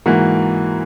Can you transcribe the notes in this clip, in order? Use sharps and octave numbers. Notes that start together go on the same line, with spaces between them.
G#2 E3 A#3 F#4